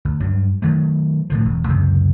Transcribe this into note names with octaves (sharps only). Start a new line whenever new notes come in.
D2
G2 F#3
D#3 F#3 A3
A2 D3 F3
E1
C#2 F#2 C3